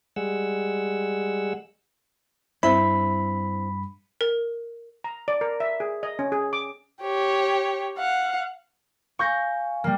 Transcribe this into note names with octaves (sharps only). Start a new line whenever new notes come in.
G3 G#3 G#4 F#5 E6
G2 C4 E4 B5
A#4
A#5
D5
A#4
E5
G#4
D#5
C#4
G#4
D6
G4 C#5
F5 F#5
F5 G#5 C#6 G6 A#6
G3 A#3